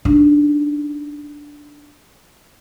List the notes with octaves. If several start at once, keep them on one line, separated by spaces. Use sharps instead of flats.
D4 D#4